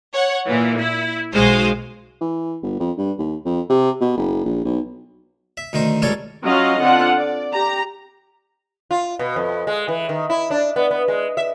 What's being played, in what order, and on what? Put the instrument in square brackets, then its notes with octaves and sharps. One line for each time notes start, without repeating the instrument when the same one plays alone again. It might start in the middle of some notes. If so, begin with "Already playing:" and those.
[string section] C#5 F#5
A#2 E3
E4
B1 G#3 F#4 C5 F5 D#6
[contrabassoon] E3
G1
F2
G2
D#2
F2
C3
B2
F#1
A#1
B1
[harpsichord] E5
D2 D#3 D#4 C5
C#2 G3 A#3 A4 C#5
[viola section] F#3 C#4 F4 F#4 D#5 F5
D3 C4 D4 F4 F#5
D5
G4 A#5
[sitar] F4
B2
F2
G#3
E3
D#3
E4
D4
B3
B3
G#3
E5